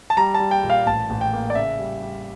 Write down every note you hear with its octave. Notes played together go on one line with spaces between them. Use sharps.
A5
G3 A#5
A5
G3
G5
A#2
F5
A1 A5
A1
G5
A#3
D5
C#3 E5
G3
G3